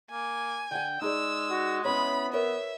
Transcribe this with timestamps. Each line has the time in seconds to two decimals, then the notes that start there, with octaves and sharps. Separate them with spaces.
0.11 A#3 G#5
0.71 D3 F#5 G5
1.01 G#3 D#4 G#4 D5 E6
1.51 F#4
1.85 B3 C#4 E4 C#5 B5
2.33 A#4 B4 C#5 E5